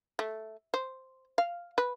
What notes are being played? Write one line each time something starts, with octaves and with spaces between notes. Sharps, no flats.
A3
C5
F5
B4